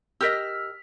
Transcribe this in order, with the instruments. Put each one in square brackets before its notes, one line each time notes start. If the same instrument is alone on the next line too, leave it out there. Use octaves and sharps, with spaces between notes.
[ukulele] G4 A#4 D#5 [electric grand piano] E6 F6 B6